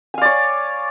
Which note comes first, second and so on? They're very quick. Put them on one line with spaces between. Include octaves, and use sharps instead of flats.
G#5 F5 D5 C#5